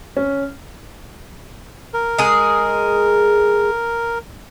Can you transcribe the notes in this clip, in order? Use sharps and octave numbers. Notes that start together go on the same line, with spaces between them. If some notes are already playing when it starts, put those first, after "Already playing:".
C#4
A#4
G#3 G#4